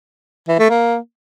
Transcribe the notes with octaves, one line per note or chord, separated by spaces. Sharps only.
E3
A3
A#3